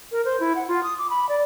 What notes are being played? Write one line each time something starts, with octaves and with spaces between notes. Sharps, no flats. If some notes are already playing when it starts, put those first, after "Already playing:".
A#4
C5
E4
F#5
F4
D#6
D6
B5
D5